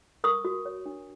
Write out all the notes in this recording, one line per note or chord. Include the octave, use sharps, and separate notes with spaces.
A#4 C#6 D#6
F#4
C#5
D4